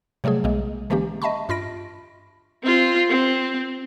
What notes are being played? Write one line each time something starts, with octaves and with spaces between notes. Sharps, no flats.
C3 F#3 G3 A3 G#4
B1 B2 G#3 A#3
D3 E3 G#3 A#3 C#4 G4
D#5 E5 A5 B5 C#6
G2 F4 B5 A#6 D7
C4 F4
C4